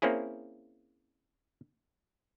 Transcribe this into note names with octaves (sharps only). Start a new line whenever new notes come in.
A#3 C4 C#4 E4 G#4